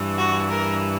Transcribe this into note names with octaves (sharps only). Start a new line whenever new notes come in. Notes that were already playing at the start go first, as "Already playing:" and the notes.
Already playing: G2 E3
F#4
A#4